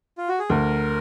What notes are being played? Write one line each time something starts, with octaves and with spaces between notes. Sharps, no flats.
F4
F#4
G#4
D2 A#4